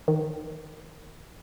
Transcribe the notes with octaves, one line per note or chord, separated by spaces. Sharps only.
D#3